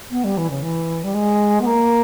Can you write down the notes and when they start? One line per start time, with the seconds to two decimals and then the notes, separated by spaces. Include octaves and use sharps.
0.11 B3
0.24 G3
0.37 E3
0.50 C#3
0.62 E3
1.04 G3
1.14 G#3
1.61 B3
1.66 A#3